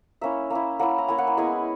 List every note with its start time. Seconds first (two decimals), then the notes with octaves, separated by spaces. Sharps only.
0.21 A#3 C#4 E4 E5
0.50 A#3 C#4 E4
0.79 A#3 C#4 E4 F#5
0.98 A#5
1.08 A#3 C#4 E4 G#5
1.18 F#5
1.27 G#5
1.37 G#3 B3 E4 G#5